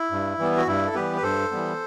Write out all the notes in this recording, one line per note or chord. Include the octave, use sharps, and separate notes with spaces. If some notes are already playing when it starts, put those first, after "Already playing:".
Already playing: E4
G2
E3 G3 B3
F#4
G2 E4
A4
E3 G3 B3 G4 B4
B4
G2 A4 C5
E3 G3 B3